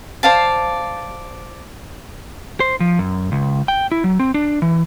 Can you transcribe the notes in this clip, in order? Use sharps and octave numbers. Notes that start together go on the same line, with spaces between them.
C5 D5 F5 A5
C5
F3
F#2
C#2
G5
E4
F#3
C4
D4
E3